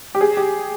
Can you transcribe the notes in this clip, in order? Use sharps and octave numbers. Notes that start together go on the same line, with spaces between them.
G4
G#4
G4